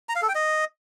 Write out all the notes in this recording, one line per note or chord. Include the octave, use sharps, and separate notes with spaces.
A#5
F5
A4
G5
D#5